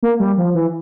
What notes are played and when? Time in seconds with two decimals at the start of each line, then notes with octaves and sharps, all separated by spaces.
0.03 A#3
0.20 G3
0.38 F3
0.55 E3